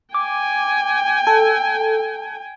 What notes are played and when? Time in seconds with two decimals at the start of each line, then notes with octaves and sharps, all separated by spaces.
0.14 G5 G#5 D6
1.27 A4